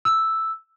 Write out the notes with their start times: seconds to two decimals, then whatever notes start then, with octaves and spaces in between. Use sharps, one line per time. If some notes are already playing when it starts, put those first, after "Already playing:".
0.05 E6